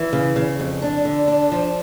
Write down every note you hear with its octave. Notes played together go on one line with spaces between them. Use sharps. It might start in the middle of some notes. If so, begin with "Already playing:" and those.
Already playing: E3
C#3
C#3
F2
D4
D3
D4
F3